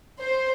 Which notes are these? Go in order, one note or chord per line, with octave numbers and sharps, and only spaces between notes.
C5